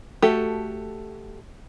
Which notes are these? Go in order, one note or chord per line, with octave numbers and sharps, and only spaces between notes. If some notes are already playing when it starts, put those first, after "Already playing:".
A3 F#4 G4 A4